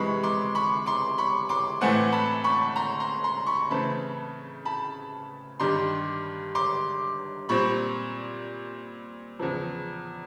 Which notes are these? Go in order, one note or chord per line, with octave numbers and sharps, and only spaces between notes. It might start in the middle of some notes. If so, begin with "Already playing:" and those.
Already playing: F2 C3 E3 G#3 B5 C#6
C6 D6
B5 C#6
C6 D6
B5 C#6
C6 D6
A2 E3 A3 C4 F#5 G#5
A5 B5
B5 C#6
A#5 C6
A#5 C6
A#5 C6
B5 C#6
C#3 E3 A3 C4 A5 B5
A5 B5
G2 D#3 G3 C6 D6
C6 D6
A#2 G3 C4 B5 C#6
E2 C#3 F3